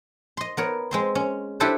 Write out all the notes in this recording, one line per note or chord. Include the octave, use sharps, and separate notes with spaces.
D#5 C6
B3 A#4 C#5
G#3 C4 C6
C#4
D4 E4 G4 A4 B4 C5